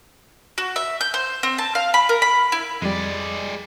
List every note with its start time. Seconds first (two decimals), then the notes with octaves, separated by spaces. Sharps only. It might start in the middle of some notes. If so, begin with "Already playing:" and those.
0.58 F#4
0.76 E5
1.01 G6
1.14 C5
1.43 C4
1.58 A5
1.75 F5
1.94 B5
2.09 A#4
2.22 B5
2.52 E4
2.82 F2 G3 G#3 D5